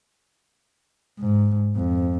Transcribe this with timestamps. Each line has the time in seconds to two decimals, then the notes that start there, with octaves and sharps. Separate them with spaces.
1.19 G#2
1.76 F2